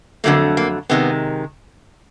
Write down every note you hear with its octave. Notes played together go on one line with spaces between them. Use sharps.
F2 D3 F#3 A3 A#3
A#3
C3 D#3 G#3 B3